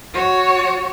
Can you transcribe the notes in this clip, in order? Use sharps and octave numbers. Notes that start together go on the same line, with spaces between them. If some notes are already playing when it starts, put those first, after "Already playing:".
F#4 C#5